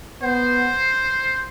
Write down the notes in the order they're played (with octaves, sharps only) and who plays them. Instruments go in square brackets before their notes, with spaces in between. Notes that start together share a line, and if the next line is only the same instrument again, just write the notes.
[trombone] B3 [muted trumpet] C5